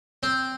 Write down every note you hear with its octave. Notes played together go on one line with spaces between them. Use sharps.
C4